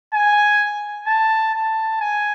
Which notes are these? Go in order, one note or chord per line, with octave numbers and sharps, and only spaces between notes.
G#5
A5
A5
G#5